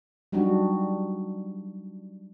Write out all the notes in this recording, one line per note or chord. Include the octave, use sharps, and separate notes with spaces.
F#3 G3 D4 D#4 F#4